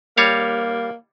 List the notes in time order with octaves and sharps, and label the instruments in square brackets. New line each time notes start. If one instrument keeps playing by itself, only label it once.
[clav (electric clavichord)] G3 C#5 F5 [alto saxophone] A#3